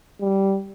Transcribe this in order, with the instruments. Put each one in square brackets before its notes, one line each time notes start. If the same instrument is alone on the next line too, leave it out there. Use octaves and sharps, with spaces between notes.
[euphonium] G3